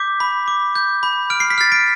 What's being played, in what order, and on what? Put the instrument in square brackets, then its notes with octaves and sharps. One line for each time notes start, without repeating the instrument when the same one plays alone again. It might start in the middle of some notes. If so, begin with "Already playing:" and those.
Already playing: [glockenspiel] D6 G6 B6
B5
D6
G6
B5
F6 D7
C7
B6
F6 A6 C7
B6 D7